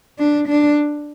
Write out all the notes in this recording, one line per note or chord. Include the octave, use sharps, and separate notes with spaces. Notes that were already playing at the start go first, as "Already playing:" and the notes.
D4
D4